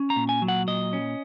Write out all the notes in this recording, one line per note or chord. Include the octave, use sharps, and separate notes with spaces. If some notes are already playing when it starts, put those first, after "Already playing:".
Already playing: C#4
A#5
A#2
G#5
F#3
F#5
A#2 D#5
C#4